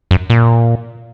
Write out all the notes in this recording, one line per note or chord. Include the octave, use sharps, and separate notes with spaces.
F#2
A#2